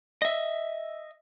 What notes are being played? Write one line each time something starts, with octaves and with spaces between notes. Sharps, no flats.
D#5 E5